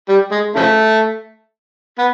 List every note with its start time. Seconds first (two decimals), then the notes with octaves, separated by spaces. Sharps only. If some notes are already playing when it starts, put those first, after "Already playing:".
0.09 G3
0.32 G#3
0.56 C#3 F3 A3
1.99 B3